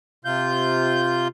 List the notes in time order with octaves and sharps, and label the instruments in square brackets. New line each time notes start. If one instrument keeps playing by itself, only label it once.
[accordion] C3 F4 G6